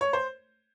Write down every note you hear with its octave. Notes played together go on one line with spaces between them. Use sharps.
C#5
C5